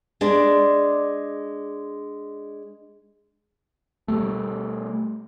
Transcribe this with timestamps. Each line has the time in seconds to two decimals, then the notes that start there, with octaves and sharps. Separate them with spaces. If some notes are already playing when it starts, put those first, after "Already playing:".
0.21 G#3 D4 D5
4.08 B2 G3 A3